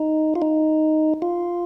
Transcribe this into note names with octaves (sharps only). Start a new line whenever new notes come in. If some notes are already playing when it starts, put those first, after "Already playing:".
Already playing: D#4
F4
D#4
F4